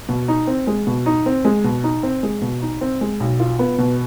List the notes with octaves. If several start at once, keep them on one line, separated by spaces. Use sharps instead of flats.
B2
D#4
C4
G#3
B2
D#4
C4
G#3
B2
D#4
C4
G#3
B2
D#4
C4
G#3
B1
F4
B3
B2